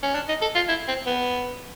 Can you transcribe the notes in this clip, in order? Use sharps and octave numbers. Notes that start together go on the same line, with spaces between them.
C#4
D4
D#4
A4
F4
E4
C4
B3